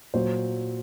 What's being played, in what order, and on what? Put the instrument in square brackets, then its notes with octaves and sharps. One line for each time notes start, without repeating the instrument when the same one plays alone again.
[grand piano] A#2 F#3 C5